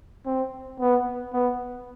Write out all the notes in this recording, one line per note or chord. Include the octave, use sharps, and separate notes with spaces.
C4
B3
B3